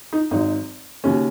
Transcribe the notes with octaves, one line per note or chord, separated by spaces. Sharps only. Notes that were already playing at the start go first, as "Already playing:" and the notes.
D#4
G#1 G#2 F#3 D#4
D#2 C#3 F#3 C#4